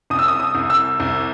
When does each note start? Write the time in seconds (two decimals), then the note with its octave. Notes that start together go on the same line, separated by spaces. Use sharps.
0.10 C2 D#6
0.19 E6
0.28 D#6
0.40 D#6
0.55 C2
0.70 E6
1.00 C2